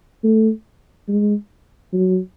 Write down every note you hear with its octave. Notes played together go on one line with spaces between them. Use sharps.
A3
G#3
F#3